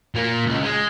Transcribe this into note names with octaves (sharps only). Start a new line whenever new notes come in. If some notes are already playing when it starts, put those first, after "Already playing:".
A#2 A#3
C#2
G#3